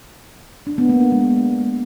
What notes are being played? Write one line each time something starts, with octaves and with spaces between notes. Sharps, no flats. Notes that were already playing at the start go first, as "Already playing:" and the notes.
D4
B3
A#3
D4
G#3